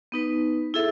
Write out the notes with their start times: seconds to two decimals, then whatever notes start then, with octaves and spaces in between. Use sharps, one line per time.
0.12 B3 D#4 B4
0.74 E4 G#4 A4 E5